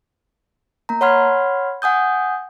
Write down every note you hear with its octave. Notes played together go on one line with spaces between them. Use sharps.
A#3 A#5
C#5 F#5 B5 C6 F6 G#6
F#5 G#5 D#6 G6